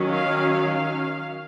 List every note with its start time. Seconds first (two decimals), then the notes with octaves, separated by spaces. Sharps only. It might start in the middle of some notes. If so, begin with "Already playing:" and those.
Already playing: D#3 F#3 C#4
0.12 F5
0.52 F5